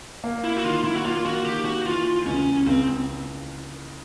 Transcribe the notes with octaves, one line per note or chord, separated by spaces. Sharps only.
A#3
E4
F#4
D#3 F4
E4
F#4
A#3 F4
F#4
D#3 G4
F#4
E3 F4
C#2 C#4
C#2 C4